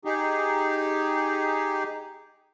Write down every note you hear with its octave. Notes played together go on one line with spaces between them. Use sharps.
D#4 G4 G#4